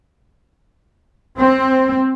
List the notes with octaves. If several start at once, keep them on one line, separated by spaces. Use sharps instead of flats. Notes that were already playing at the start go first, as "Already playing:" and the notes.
C4